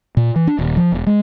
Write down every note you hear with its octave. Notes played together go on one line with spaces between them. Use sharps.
A#2
E3
D4
D#1
F3
E1
G#3